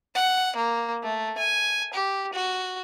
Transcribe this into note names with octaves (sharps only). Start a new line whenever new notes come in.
F#5
A#3
A3
G#5
G4
F#4